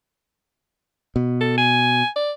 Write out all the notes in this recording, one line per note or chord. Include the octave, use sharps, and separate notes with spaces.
B2
A4
G#5
D5